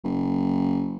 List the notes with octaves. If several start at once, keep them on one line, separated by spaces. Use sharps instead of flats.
F#1